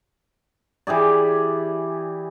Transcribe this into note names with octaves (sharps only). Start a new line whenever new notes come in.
E3 G4 G#4 D5